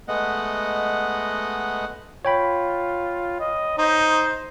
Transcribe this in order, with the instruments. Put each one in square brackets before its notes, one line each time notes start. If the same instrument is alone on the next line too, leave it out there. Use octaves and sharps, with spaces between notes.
[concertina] G#3 A3 B3 D#5 F#5
[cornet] F4 [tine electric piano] C#5 G5 B5
[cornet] D#5
[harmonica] D#4 [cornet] C5